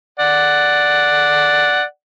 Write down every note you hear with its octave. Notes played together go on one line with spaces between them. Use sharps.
D5 F#5